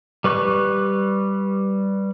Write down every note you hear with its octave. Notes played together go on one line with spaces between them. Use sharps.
G3 B4 C#6 F#6